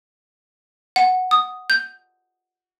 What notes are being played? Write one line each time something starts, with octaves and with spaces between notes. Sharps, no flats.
F#5
D#6
G6